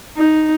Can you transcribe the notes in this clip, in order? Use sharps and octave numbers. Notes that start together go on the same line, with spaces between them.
D#4